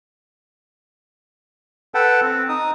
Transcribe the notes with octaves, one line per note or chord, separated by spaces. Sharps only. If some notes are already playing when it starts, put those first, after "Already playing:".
A4 B4 F#5 G5 A5
C4
D#4 D#6